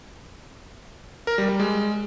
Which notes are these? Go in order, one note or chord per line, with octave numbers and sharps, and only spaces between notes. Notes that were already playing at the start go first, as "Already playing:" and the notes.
A#4
G3
G3
G#3